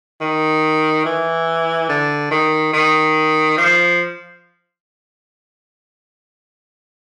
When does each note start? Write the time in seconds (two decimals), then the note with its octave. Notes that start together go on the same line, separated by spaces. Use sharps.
0.21 D#3
1.05 E3
1.89 D3
2.31 D#3
2.73 D#3
3.58 F3